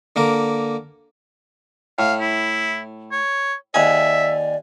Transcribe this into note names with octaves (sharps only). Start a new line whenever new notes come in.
D3 A#3 A#4
A2 F5
E4
C#5
D#2 G#4 D5 E5